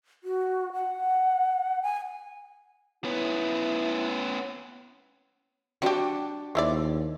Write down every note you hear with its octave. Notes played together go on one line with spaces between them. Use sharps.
F#4
F#5
G#5
B3 C#4 E4
G3 D4 F#4 G4 C#6
D#2 F3 E4 D5